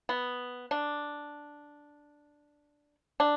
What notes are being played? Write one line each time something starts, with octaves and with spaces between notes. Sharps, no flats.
B3
D4
D4